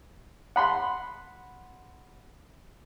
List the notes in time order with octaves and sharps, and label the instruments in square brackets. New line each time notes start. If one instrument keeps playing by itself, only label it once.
[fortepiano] F#5 B5 C6